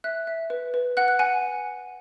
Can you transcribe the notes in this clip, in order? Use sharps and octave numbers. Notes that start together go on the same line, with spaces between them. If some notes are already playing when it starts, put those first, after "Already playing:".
E5 F#6
E5
B4
B4
F#5 F#6
F#6
F#5 G#5